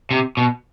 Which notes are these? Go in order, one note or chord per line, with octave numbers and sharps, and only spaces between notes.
C3
B2